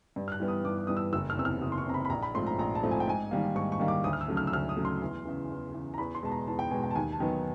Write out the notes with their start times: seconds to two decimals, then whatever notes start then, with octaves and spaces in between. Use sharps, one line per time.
0.16 G2
0.28 F6
0.32 F#6
0.40 E3 G3 B3
0.48 D#6
0.64 G2 D6
0.78 D6
0.87 E3 G3 B3 D#6
0.97 E6
1.13 F#1 E6
1.30 F6
1.37 E2 C3 E6
1.45 F6
1.61 F#1 D#6
1.72 C6
1.78 C#6
1.86 E2 C3 A#5
1.94 B5
2.05 B5
2.10 A#1 A#5
2.23 B5
2.34 G#2 F3 A3 C4 C6
2.47 A#5
2.58 A#1 A#5
2.75 A5
2.83 G#2 F3 A3 C4
2.91 G#5
3.00 G5
3.07 G#2 G#5
3.31 D#3 G3 A#3
3.56 G#2 C#6
3.72 C#6
3.79 D#3 G3 A#3
3.88 D6
4.04 D2 D#6
4.13 F6
4.21 E6
4.28 C#3 F#3 A3
4.37 F6
4.47 E6
4.53 D2 F6
4.69 D#6
4.77 C#3 F#3 A3
4.85 C6
5.02 E2
5.25 C#3 E3
5.50 E2
5.74 C#3 E3
5.94 A#5
5.98 E2 B5
6.15 C6
6.23 B2 G#3 A5
6.32 A#5
6.47 E2 A5
6.59 G5
6.71 B2 G#3 G#5
6.84 G5
6.91 A5
6.95 D#2 G#5
7.12 A5
7.20 D#3 F#3 B3